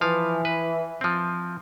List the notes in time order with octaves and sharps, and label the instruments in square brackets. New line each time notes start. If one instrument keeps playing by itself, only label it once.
[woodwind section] E3 [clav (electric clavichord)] F3 F5
[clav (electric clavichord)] B4
F3 C4